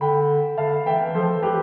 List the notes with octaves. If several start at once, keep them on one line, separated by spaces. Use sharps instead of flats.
D3 G5 B5
D3 F5 A5
E3 E5 G5
F3 A4 C5
E3
G4 B4